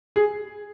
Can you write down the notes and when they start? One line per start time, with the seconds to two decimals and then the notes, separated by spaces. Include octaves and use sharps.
0.16 G#4